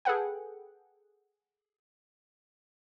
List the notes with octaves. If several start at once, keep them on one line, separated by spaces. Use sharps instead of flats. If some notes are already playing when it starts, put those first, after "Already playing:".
G#4 A4 B4 F#5 G5